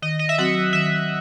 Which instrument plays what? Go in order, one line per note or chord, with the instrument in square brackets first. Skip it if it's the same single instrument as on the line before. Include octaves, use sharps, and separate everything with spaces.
[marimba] D#3 [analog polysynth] D#5
[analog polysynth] D#5
E5
[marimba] F#3 C4 F#4 [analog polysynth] F#5
[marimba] D#3 [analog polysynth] E5